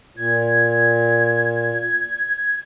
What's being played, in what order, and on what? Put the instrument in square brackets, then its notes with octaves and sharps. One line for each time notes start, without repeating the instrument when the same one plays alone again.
[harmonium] A#2 [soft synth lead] G#6